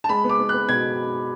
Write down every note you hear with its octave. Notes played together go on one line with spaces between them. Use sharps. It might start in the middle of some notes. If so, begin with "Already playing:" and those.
A5
G#3 B5
B3
D6
B3
B3 F#6
B2 G#6